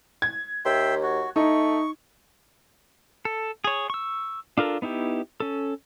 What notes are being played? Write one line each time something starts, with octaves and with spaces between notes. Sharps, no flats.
G#6
D#2 E5 G5 C6
F#4
A3 D#4 C#6
A4
G#4 C#5
C#6 E6
D4 F4 A4 A#4
B3 D#4 E4 G4
C#4 A4